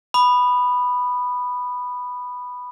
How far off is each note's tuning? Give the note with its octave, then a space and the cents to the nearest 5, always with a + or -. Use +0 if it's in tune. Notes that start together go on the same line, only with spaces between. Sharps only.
B5 +0 D#6 -30